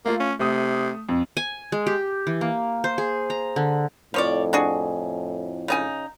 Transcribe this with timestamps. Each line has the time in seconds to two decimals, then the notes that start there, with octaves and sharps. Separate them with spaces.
0.05 A3 A#3 F4
0.20 C#4
0.40 C3 A3 D#6
1.09 F2
1.37 G#5
1.72 G#3
1.87 G4
2.27 E3
2.41 A#3
2.84 C5
2.98 G#4
3.30 A#5
3.56 D3
4.14 F2 A2 F3 C#5 D5
4.53 D4 F#4 G#4
5.68 C#3 D#4 G#5